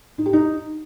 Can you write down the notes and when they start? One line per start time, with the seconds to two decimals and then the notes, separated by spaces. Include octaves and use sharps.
0.18 D#4
0.26 G4
0.33 D#4